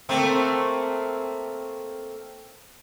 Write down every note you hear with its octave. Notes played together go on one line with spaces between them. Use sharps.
A3 A#3 C4